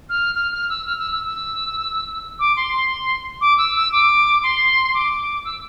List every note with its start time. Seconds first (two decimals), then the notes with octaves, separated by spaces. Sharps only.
0.09 F6
0.35 F6
0.52 F6
0.69 E6
0.86 F6
0.99 E6
1.12 E6
1.25 E6
2.40 D6
2.56 C6
2.73 C6
3.41 D6
3.58 E6
3.75 E6
3.92 D6
4.43 C6
4.94 D6
5.45 E6